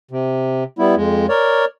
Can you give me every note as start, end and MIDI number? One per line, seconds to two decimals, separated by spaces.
0.11 0.64 48
0.79 0.95 55
0.79 0.95 59
0.79 0.95 64
0.96 1.26 41
0.96 1.26 56
1.29 1.65 70
1.29 1.65 73
1.29 1.65 74